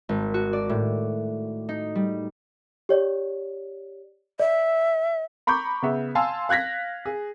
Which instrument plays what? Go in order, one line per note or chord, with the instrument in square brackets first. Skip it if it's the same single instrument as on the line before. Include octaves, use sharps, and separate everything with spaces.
[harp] G#1
F#4
D5
A2
D#4
G3
[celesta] G4 C#5 D5
[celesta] D5 [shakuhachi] E5
[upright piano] A#5 B5 C#6 D6 G6
C#3 B3 E5
F5 G#5 A5 C6 E6
F5 F#6 G#6 A#6 B6
G#4